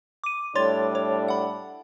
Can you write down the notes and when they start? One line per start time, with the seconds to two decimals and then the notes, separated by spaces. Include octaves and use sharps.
0.24 D6 D#7
0.55 A2 G3 D4 C#5 C6 A6
0.95 C#5
1.28 F#5 B5